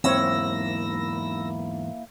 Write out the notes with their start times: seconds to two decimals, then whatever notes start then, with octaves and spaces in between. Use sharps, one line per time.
0.04 E2 G#2 A#3 C4 E4 C#5 E6 A#6